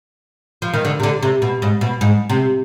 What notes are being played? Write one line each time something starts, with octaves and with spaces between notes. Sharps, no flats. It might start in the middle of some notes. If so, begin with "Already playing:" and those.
F3
D#3
D3
C3
D3
C3
B2
G#2
B2
G#2
C3